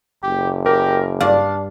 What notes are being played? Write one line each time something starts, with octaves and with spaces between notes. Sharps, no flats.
F#1 G4
G4 A#4
G2 D4 D5 F5